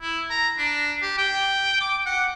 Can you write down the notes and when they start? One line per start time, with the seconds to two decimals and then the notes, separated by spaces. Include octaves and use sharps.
0.01 E4
0.31 A#5
0.58 D4
1.02 G4
1.18 G5
1.81 D6
2.06 F#5